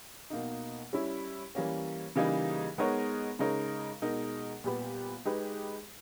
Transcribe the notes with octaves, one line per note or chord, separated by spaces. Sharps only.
B2 A#3 D#4
G3 C#4 E4
E3 G3 A#3 C#4
C#3 E3 G3 A#3 D#4
G#3 B3 D#4 A#4 C#5
C#3 G#3 D#4 A#4 C#5
B2 G#3 D#4 A#4
A#2 G3 B3 G4 B4
G#3 D#4 G4 B4